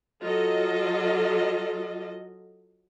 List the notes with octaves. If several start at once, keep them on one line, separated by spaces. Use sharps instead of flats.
F#3 F4 A4 D#5